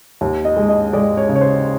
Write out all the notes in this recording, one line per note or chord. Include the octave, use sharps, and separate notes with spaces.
D#2
D#5
G#3
D#5
G#3 D5
C#5
C#3
C#5
C5